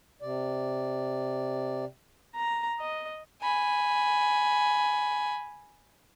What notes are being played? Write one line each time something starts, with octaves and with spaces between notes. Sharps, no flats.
C3 D5
A#5
D#5
G#5 B5